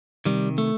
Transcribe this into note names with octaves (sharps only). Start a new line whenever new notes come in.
C3 D#3 G3
A3